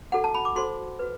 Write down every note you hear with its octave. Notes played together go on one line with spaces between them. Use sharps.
D4 F#4 A4 F#5
A5
B5
D6
F#4 A4 C5 C6
F#4 B4